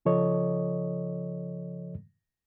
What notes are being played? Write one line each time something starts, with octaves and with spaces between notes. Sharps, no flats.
C#3 F3 A4 C#5 D#5